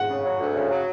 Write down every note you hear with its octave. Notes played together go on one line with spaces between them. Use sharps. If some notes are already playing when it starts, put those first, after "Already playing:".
Already playing: F#5
C#3
F#3
D2
C#3
F#3